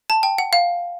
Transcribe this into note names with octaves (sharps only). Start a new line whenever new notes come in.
A5
G5
F#5
F5